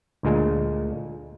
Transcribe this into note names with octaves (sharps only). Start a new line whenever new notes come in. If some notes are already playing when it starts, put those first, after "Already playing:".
D2 A#2 G#3